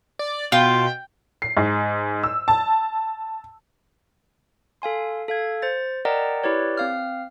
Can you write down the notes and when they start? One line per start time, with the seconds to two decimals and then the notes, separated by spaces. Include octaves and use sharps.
0.19 D5
0.52 B2 F4 G5
1.42 C7
1.57 G#2
2.24 E6
2.48 A5
4.82 A4 F5 G#5 C6
5.28 A4 F5 G#6
5.62 C5 A6
6.05 A#4 D5 D#5 F#5 G5 A#5
6.43 E4 G4 B4 C#5 D5
6.77 C4 F5 F6